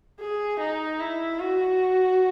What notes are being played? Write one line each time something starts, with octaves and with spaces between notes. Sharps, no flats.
G#4
D#4
E4
F#4